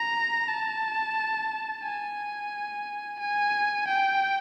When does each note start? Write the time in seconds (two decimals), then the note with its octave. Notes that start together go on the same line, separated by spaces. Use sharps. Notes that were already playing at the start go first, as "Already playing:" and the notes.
Already playing: A#5
0.48 A5
1.83 G#5
3.20 G#5
3.87 G5